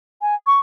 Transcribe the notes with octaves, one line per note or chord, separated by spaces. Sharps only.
G#5
C#6